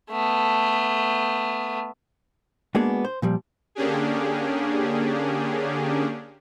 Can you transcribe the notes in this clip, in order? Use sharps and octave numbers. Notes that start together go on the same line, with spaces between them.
A3 B3
G#3 A#3 B3 D4 F#4 G#4
C5
A#2 F3 G3
D3 A#3 C#4 D4 G4 G#4